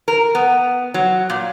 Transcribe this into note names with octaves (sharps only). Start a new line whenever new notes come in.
A#4
B3
F#3
A#2